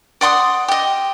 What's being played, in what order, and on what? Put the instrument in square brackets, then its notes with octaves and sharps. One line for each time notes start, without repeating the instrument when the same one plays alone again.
[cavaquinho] D5 F#5 C6 D#6
G4 D#5